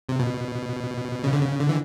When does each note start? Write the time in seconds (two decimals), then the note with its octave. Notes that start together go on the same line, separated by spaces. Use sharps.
0.09 C3
0.20 B2
1.24 C#3
1.33 D3
1.42 C#3
1.60 D3
1.69 E3